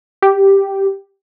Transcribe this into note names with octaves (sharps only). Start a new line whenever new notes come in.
G4